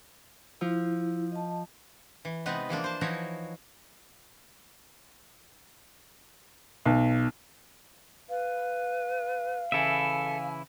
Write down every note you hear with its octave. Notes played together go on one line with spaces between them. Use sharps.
F3 E4
D#5 A5
E3
C3 G#3 B3 D#4 B4
E3 F3 A#3 D4
C5 A5
E3 F3 D#4 E4 F#4 C#5
B1
B4 F5
C#3 E3 E4 A4 E5 G#5